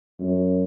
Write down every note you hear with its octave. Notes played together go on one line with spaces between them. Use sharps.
F#2